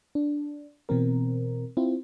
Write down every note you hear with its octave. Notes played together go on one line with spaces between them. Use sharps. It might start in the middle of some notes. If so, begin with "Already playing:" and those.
D4
B2 E3 C4 A#4
C4 E4 F4